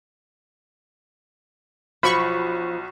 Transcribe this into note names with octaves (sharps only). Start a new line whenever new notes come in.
B1 F3 B5 C#6